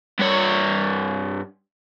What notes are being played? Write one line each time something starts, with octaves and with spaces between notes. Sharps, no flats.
G2 C#5